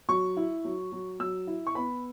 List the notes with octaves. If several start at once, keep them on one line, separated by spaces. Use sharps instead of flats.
F#3 C#6
E4
F#3
F#3
F#3 E6
E4
C#6
B3 B5